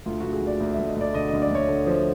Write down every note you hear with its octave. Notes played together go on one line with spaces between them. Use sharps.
D2 F4
D2 F#4
G#4
D2
D5
D2
E5
D2
D#5
D2 D5
D3 D#5
D#5
D2
D5
D2 C#5
D3
F3